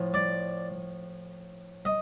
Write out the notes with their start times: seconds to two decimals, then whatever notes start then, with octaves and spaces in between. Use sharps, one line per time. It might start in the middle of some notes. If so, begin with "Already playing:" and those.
Already playing: A2 F3
0.14 D5
1.85 D#5